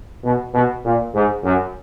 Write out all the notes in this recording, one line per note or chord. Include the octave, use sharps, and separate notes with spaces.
B2
B2
A#2
G#2
F#2